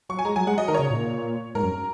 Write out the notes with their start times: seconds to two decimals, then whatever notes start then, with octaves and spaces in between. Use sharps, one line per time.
0.09 F#3 C#6
0.19 G#5
0.25 G#3 A#5
0.36 F#3 G#5
0.47 G#3 F#5
0.57 F#3 D#5
0.68 D#3 A#4
0.74 C#3 C#5
0.90 A#2
1.55 G#2 A#4
1.63 F#2